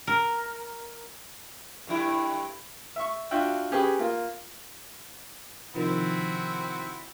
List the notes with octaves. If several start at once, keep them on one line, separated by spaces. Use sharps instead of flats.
A#4
G2 D3 E4
E5 C#6
D4 F4 F#4 E5 G5
C#4 G4 G#4 B4
A#3 F4
C3 D#3 F3 C4 E4 F#4